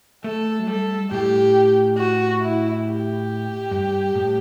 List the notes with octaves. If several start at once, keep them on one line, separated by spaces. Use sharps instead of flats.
A3 A4
F#3
G3 A4
A2 G4
F#4
E4
G4
G2
A2